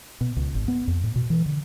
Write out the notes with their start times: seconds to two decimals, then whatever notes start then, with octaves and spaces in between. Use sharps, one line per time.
0.21 B2
0.36 C#2
0.55 G#1
0.68 B3
0.87 F2
1.03 A2
1.16 B2
1.30 E3
1.46 D3